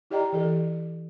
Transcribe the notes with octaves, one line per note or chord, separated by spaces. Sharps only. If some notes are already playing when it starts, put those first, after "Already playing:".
E4 G4 D5 D#5 G5 A#5
E3 G4 A4